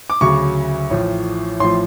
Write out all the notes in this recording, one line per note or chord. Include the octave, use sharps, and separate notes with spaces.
D6
D2 C#3 F#3 C#6
A1 A2 F3
A1 A2 F3 C6